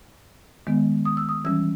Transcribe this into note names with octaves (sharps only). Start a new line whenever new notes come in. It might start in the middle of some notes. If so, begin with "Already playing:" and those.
D#3 G#3 B3
D#6
E6
D#6
E3 G3 C#4 E6